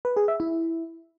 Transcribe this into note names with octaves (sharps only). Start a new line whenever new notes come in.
B4
G#4
E5
E4